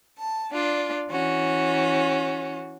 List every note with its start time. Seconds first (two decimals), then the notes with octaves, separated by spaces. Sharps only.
0.17 A5
0.52 D4 F4 D5
1.09 E3 C#4 F#4